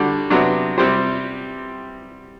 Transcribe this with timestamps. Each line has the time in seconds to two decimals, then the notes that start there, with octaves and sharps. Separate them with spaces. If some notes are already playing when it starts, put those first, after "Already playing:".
Already playing: D3 G3 D4 F#4
0.30 C3 F#3 B3 D4
0.78 C3 G3 C4 G4 C5